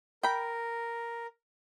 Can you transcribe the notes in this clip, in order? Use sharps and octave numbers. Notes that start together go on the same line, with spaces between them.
A#4 G5 B5